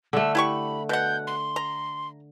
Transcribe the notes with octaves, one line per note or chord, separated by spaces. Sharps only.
D3 A3 E6
E4 G4 B5 C#6
B2 F#5 G6
C6
A#5